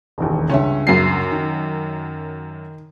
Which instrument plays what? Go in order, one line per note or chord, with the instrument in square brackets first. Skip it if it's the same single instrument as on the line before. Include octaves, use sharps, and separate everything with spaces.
[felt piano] E1 A1 D#2
[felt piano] C#2 G2 E5 [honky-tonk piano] C#4
[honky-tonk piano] F#2 F#3 C7
[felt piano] D#3